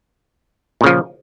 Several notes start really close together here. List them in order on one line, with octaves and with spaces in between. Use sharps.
A#2 C#3 F3